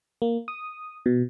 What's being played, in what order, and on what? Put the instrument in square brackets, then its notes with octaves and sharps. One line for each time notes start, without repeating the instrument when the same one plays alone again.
[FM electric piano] A#3
D#6
B2